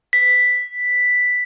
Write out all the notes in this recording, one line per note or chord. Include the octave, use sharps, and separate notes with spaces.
B6